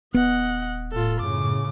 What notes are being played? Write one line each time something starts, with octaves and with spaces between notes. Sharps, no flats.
D#1 B3 D#5 F#5
A2 F4 A4
F#2 A2 C#3 D6